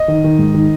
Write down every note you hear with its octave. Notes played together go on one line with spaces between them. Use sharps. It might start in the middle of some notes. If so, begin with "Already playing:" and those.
Already playing: D#5
D#3
D#3
G#2
D#3